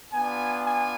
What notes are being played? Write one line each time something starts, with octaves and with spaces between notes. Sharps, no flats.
B3 D4 F4 G#5
G#5